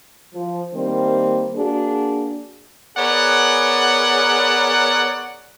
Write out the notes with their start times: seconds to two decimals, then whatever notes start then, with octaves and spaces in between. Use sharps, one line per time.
0.34 F3
0.74 D#3 G3 A#3 C4
1.55 A#3 D4 F#4 G#4
2.97 B3 G#4 A#4 C#5 D5 F#5